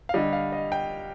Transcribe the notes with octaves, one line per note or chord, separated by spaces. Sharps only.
F5
D3 G3 D#5
F5
D#5
G5